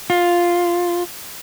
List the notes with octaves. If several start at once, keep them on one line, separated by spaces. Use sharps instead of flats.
F4